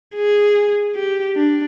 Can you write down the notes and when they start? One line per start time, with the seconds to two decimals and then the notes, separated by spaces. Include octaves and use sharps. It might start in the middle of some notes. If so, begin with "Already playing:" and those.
0.16 G#4
0.96 G4
1.36 D4